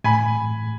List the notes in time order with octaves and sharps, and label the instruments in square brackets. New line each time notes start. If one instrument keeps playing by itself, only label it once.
[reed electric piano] A2 [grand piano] G#5 B5